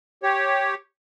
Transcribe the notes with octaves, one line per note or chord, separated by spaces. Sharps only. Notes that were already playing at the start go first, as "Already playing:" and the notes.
G4 C#5